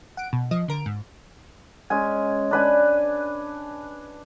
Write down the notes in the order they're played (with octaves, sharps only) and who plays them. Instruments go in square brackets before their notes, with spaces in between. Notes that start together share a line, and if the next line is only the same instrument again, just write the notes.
[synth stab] F#5 D7
B2
F3 D#5
D3 A#4 D7
G#2
[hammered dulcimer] G#3 C#4 G#5
D4 B4 G#5